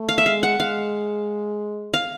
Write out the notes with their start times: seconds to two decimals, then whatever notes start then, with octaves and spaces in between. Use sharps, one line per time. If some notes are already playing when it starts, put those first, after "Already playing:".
Already playing: A3
0.09 F5
0.18 E5
0.25 G#3 F5
0.43 F#5
0.59 G#3 F5
1.94 F5